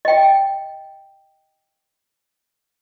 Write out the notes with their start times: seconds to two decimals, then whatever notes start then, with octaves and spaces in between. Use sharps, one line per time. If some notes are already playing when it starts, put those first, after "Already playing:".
0.05 D#5 G5